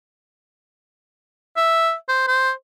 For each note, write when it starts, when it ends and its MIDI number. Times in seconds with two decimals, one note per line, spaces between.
1.57 1.94 76
2.08 2.24 72
2.27 2.51 72